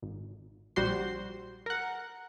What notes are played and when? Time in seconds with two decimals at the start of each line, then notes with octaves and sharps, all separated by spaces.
0.02 G#1
0.76 A#1 G3 F#4 C5 C6
1.66 A#4 F#5